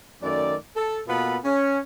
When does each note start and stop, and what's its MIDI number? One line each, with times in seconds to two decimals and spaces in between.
0.23 0.56 42
0.23 0.56 51
0.23 0.56 57
0.23 0.56 74
0.76 1.00 69
1.08 1.37 47
1.08 1.37 58
1.08 1.37 59
1.08 1.37 65
1.08 1.37 69
1.08 1.37 83
1.45 1.79 61